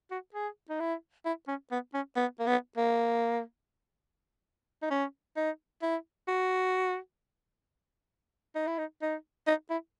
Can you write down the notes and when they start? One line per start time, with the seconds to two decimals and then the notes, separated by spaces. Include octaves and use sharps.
0.11 F#4
0.34 G#4
0.70 D#4
0.80 E4
1.25 E4
1.48 C#4
1.71 B3
1.94 C#4
2.16 B3
2.39 A#3
2.47 B3
2.77 A#3
4.82 D#4
4.90 C#4
5.37 D#4
5.82 E4
6.28 F#4
8.55 D#4
8.67 E4
8.78 D#4
9.02 D#4
9.47 D#4
9.70 E4